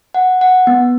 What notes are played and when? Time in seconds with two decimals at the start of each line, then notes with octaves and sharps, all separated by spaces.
0.14 F#5
0.41 F#5
0.67 B3